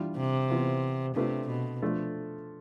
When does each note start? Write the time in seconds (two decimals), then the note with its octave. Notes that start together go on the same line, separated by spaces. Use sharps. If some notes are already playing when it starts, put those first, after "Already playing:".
Already playing: E3 G3 D4 F4
0.17 C3
0.50 E3 B3 F4 C5
1.15 C3 A3 D4 F4 B4
1.49 B2
1.82 F3 A3 D4 A4